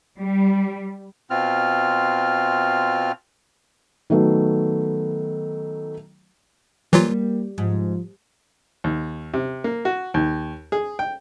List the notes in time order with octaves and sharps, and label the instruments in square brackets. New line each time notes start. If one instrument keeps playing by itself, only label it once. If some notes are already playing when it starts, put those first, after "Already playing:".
[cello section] G3
[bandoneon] B2 C4 F4 F6
[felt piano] D#3 F#3 A3 B3
[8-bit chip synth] E3 F#3 F4 [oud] G3 [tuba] A#3
[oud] G#2 [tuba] F3
[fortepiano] D#2
C3
A#3
F#4
D#2
G#4
G5